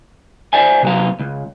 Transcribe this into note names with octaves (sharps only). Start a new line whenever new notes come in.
C5 D5 E5 G#5
C3 F#3 F5
C#2